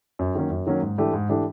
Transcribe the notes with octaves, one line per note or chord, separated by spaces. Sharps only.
F#2
D#3 F#3 A#3 C#4
F#2
D#3 F#3 A#3 C#4
G#2
E3 A3 D4 G4
G#2
E3 A3 D4 G4